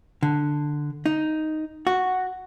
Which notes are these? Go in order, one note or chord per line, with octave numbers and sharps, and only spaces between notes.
D3
D#4
F#4